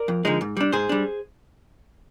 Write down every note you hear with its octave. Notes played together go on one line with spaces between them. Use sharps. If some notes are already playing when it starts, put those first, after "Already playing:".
Already playing: A#4 D5
F2
D3 F3 G#3 D#4
G#2
G3 D4
G#2 G#4 C5
G3 D4